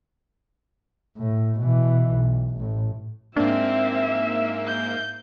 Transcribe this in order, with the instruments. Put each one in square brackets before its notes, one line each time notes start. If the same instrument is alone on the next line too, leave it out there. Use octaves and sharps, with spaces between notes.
[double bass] A2
B2 E3
B1
A1 A2
[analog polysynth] G#2 A#3 [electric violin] C4 [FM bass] D4 [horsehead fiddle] E5
[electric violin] G6